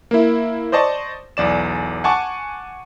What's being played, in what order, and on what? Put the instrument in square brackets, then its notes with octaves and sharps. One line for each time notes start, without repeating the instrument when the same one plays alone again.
[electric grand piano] A#3 E4
C5 D5 D#5 A5 C#6
B1 E2 D5 E7
F#5 G#5 A5 C#6 D6